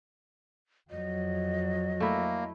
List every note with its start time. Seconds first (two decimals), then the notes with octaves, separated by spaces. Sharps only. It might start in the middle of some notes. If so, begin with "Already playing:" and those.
0.90 F2 F#3 D#5
2.00 A3 A#3 E4